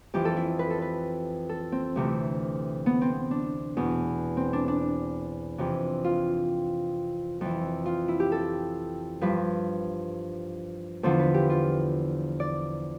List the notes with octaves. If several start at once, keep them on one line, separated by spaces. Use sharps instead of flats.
F2 E3 G4
A4
E4
B4
A4
B4
A4
C4
D2 C3 E3
B3
C4
D4
E2 B2
C4
D4
D4
F2 C3 E3
F4
F2 E3
F4
E4
G4
A4
G2 F3 B4
E2 D3 F3 C5
B4
G4
F4
D5